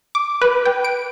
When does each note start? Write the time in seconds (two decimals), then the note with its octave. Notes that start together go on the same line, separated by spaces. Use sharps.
0.15 D6
0.42 B4
0.65 G5
0.85 D7